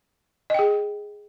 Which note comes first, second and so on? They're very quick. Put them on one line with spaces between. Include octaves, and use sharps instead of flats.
D#5 G5 G#4